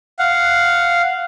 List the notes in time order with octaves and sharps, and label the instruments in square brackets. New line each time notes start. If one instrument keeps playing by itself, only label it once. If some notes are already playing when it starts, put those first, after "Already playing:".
[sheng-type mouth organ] F5 F#5